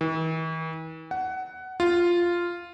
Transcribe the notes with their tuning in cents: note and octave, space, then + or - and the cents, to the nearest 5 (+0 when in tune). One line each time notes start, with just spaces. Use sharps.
E3 -45
F#5 +15
F4 -5